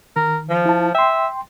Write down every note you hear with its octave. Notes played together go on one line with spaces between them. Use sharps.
D#3 A#4
F3
E4 A5
E5 G5 C6